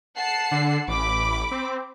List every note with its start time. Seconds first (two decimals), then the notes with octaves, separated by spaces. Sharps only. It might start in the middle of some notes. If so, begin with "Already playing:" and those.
0.16 F#5 A5 C7
0.51 D3
0.88 A1 B5 D6
1.51 C4